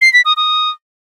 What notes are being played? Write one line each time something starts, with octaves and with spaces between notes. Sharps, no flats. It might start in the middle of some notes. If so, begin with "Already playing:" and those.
C7
B6
D#6
D#6